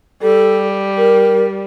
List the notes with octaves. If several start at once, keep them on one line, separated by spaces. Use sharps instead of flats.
G3 A4
A#4